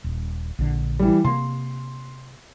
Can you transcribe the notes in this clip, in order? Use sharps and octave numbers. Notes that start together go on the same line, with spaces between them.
D#1
A#1 D3
E3 G3
C3 A#3 C6